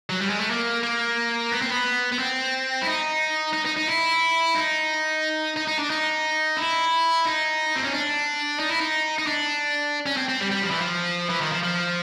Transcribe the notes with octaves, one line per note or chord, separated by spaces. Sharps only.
F#3
G3
G#3
A3
A#3
A#3
B3
C4
B3
B3
C4
E4
D#4
D#4
D#4
D#4
E4
D#4
D#4
D#4
D4
D#4
E4
D#4
C4
C#4
D4
D#4
E4
D#4
D#4
D4
C#4
C4
C4
G3
G3
F3
E3
F3
E3
D#3
F3
F3